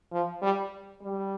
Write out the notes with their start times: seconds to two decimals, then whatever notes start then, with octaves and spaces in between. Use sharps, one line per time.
0.12 F3
0.42 G3
1.02 G3